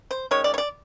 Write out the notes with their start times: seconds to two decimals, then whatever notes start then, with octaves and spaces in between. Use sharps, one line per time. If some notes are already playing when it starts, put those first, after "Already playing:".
0.11 C5
0.31 D#3 G#3 C#4 C#5
0.44 D5
0.54 C#5
0.58 D5